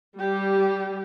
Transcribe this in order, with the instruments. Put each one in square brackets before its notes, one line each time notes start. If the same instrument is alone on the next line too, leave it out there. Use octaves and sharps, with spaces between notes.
[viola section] G3 [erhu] G4